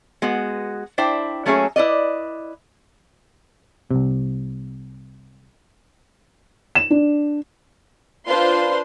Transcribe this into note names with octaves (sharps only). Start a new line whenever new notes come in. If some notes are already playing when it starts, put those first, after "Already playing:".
G#3 B3 F#4
D4 E4 C5 E5 G5
F#3 A3 A#3 C#4 G#4 E5
E4 B4 D5 D#5
C2 C3
E7
D4
D4 F4 B4 C5 C6